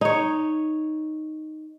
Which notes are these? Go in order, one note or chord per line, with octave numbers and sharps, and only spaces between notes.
D#4 C#5